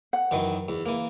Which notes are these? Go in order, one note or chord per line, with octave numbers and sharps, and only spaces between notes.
F#5
F#2 D#3 E3
E2
E3 A#3